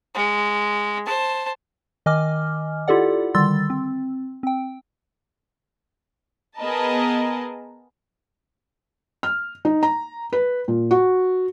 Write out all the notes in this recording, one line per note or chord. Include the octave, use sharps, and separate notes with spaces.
G#3
C5 A5
D#3 D#5 G#5 D6 F6
E4 F4 G4 A4 D5 F#5
D3 D#3 G3 C6 E6 A6
C4
C4 G5
B3 G#4 A#4 B4 D#5 A5
F6
D#4
A#5
B4
A#2
F#4